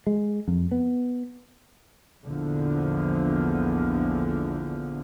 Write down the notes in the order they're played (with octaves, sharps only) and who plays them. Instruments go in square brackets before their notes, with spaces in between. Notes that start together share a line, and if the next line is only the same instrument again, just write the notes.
[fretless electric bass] G#3
F2
B3
[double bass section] A#1 E2 D3 F3